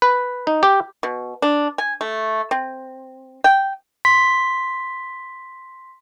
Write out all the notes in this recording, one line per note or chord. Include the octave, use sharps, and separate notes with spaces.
B4
D#4
G4
B2
D4
G#5
A3
C4
G5
C6 B6